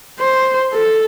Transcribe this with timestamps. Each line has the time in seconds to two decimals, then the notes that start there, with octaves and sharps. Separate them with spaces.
0.20 C5
0.74 A4